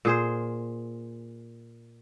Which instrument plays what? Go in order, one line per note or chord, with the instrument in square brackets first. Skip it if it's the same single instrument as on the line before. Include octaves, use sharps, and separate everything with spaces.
[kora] A#2 G#4 C5